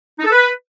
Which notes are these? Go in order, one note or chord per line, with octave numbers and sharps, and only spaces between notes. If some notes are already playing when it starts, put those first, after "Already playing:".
D#4
A4
B4